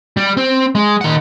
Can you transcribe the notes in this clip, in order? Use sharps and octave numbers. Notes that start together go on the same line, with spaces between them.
G3
C4
G#3
D#3 F#5